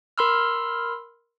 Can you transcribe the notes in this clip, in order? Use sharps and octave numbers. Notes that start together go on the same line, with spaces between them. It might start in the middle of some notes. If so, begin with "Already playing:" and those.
A#4 B5 C6 E6 F6